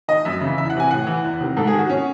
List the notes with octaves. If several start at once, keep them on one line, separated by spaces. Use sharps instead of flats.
D#3 D#5
F#2 E5
C#3 E3
E2 E5
F#5
C3 E3 G#5
A2 F#5
E3
E2
C3 D#3
G#2 A4
G#4
D#3
F#4
C#4